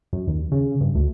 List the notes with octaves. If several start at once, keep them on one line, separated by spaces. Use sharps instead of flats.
F#2
D#2
C#3
G2
D2